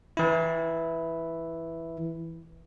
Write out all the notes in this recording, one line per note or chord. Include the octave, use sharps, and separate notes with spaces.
E3 E4